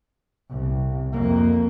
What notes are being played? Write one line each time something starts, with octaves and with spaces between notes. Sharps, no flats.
C2
F2 A#3